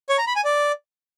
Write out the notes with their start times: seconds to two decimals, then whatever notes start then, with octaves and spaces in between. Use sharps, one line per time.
0.09 C#5
0.18 A#5
0.27 B5
0.36 G#5
0.45 D5